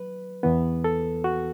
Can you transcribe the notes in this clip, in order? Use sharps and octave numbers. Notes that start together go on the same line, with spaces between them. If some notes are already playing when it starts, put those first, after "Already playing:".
Already playing: F#3 B4
E2 E3 B3
A4
F#4